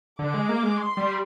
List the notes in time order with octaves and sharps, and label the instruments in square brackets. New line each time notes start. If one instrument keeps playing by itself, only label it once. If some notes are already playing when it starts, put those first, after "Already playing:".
[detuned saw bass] D3 [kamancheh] D6
[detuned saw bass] G#3
A#3
G#3
[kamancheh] C6
[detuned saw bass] G3